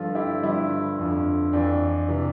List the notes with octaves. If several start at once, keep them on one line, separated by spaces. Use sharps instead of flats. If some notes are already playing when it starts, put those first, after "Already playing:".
Already playing: G2 D3 F3 F4 A4
E4 G4
G2 D3 F3 E4
F2 D3 F3
F2 E3 D4
C3 E3